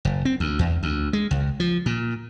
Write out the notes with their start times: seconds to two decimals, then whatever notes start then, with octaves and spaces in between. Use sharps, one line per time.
0.05 F#1
0.25 C4
0.40 D2
0.59 E2
0.83 D2
1.13 G#3
1.31 C#2
1.60 F3
1.86 A#2